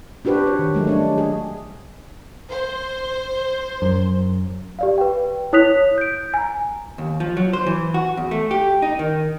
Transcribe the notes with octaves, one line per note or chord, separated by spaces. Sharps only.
D4 F#4 G4 B4 C5
C#5
D#3
F#3 G#3 A3
G3 D4 C#5
G#4
C5
F#2
G4 D5 F5
B4 G5
E4 C#5 D#6 F#6 B6 F7
G6 D7
G#5 A#5
D#2
F3
F#3
C5
E3
F#4
E2
A3
G4
D#4
D#3